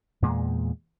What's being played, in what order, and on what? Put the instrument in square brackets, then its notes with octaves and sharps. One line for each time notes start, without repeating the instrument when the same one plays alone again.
[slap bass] E2 A#2 G#3